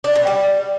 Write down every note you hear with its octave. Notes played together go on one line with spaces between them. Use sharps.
D4
B2
G3